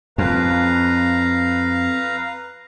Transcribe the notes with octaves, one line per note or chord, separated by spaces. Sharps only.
F2 B4 F5 A#5